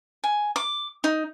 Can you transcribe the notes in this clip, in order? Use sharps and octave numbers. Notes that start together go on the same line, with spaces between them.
G#5
D6
D#4